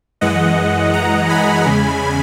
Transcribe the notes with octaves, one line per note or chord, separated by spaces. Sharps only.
F#2 E3 G#3 D#5 F#5
F#5 A#5
G#5 B5
E2 C#3 G#3